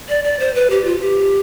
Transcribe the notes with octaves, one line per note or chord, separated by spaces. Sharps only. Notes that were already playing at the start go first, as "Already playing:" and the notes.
D5
D5
C5
B4
G4
F4
G4